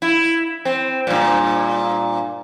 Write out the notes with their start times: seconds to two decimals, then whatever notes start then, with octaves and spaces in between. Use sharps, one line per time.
0.02 E4
0.65 C4
1.07 G2 A#2